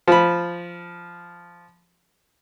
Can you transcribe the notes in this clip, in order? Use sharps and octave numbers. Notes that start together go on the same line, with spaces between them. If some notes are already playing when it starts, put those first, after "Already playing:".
F3 B5